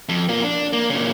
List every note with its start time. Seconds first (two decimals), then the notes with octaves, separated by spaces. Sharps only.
0.09 F2
0.29 A#3 F4
0.43 D4
0.73 A#3
0.90 A#2 C#3